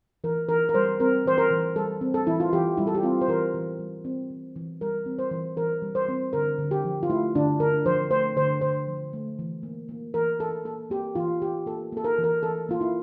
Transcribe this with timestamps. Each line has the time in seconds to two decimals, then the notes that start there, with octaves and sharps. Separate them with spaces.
0.24 E3 A#4
0.49 E3 A#4
0.69 A#4
0.74 G3 C5
1.00 C4 A#4
1.26 E3 C5
1.38 A#4
1.51 E3
1.76 G3 A4
2.01 C4
2.14 A4
2.27 E3 E4
2.40 F4
2.53 E3 G4
2.77 G3 E4
2.87 A4
2.95 G4
3.03 C4 F4
3.21 C5
3.28 E3 A#4
3.54 E3
3.79 G3
4.05 C4
4.30 E3
4.56 E3
4.81 G3 A#4
5.06 C4
5.19 C5
5.31 E3
5.57 E3 A#4
5.82 G3
5.95 C5
6.08 C4
6.33 D3 A#4
6.59 D3
6.71 G4
6.85 F3
7.03 F4
7.10 A3 E4
7.35 D3 D4
7.60 D3 A#4
7.86 F3 C5
8.11 A3 C5
8.37 D3 C5
8.61 D3 C5
8.87 F3
9.13 A3
9.39 E3
9.63 A#3
9.89 A#3
10.14 E3 A#4
10.39 E3 A4
10.65 A#3 A4
10.90 A#3 G4
11.15 E3 F4
11.42 E3 G4
11.66 A#3 A4
11.92 A#3 A4
12.04 A#4
12.18 E3
12.24 A#4
12.43 E3 A4
12.69 A#3 F4
12.81 E4